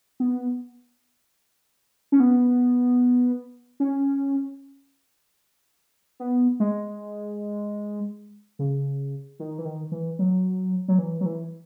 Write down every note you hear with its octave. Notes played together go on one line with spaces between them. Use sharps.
B3
C#4
B3
C#4
B3
G#3
C#3
D#3
E3
D#3
E3
F#3
F#3
E3
F#3
E3